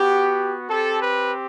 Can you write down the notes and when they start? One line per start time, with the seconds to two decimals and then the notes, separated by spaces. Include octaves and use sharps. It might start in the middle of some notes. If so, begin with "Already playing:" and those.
Already playing: B3 F#4 G4
0.68 C4 G4 A4
1.01 B4